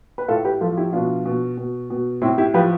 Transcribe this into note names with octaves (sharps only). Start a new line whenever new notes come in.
B4
A2 F4 A4
G4 B4
F3 F4 A4
E4 G4
B2 D4 F4
B2
B2
B2
A2 C4 E4
E4 G4
F3 G4 B4